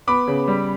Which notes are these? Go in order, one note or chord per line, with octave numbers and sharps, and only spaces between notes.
B3 B5 D6
C#3
G3